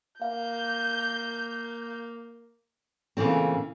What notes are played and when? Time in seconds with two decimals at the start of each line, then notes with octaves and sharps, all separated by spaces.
0.22 A#3 F5 G6
3.17 A#2 C#3 E3 A3 C4